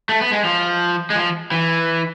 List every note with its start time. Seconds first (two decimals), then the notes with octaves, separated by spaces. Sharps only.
0.09 A3
0.21 B3
0.32 G#3
0.45 F3
1.10 G#3
1.16 F3
1.51 E3